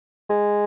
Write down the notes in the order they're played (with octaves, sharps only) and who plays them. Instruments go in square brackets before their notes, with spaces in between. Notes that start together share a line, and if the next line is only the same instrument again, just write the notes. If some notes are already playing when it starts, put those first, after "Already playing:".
[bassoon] G#3